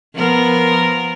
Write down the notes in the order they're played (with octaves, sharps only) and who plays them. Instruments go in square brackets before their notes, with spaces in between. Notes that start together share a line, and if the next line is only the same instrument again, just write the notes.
[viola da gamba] F3 B3 A#4